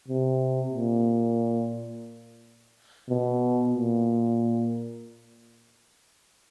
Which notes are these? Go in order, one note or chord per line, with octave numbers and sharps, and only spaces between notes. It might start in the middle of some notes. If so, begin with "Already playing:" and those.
C3
A#2
B2
A#2